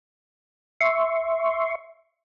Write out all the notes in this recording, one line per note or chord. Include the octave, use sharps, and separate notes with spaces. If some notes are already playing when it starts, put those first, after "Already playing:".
E5 C6 C#6